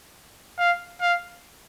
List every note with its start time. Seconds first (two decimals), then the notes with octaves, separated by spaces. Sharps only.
0.59 F5
1.01 F5